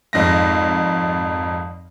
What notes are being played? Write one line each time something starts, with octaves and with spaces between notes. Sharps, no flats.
G#1 F2 G#2 A#6